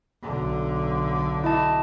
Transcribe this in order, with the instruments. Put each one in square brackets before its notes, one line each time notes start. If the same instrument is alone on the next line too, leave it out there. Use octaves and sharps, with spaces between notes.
[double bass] B1 D3
[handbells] E4 D#5 A5